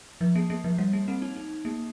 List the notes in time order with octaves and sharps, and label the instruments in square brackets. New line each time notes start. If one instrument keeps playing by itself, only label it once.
[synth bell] F3
A#3
A#3
F3
G3
A#3
C4
D#4
D#4
A#3